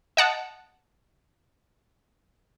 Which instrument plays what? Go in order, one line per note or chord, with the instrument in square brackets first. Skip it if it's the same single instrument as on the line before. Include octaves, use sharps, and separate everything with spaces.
[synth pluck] D#5 F#5 A5